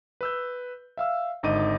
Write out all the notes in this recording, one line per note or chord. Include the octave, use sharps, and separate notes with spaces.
B4 E6 G6
E5 F5 E6
G#1 D3 D#4 D#5 D6 D#7